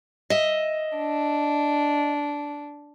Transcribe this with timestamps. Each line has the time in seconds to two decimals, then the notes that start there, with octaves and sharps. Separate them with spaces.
0.30 D#5 E5
0.98 D4